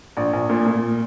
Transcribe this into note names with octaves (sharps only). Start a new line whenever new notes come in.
A#1
A#1
A#2
A#2